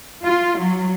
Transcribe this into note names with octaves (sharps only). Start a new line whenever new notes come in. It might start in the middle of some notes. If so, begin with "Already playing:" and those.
F4
F#3